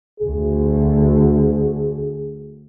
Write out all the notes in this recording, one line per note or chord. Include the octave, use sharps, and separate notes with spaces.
D2 G#4